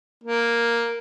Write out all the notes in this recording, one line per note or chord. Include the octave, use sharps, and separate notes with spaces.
A#3